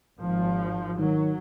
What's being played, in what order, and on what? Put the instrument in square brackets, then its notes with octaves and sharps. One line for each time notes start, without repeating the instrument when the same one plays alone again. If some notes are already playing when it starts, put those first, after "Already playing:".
[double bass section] G#1 F3
[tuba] D#3 [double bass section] F#3